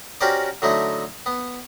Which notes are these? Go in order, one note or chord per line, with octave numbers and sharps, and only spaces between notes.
C#4 F#4 G4 A#4 C5 D5
D3 F#3 A3 D#4 E4
B3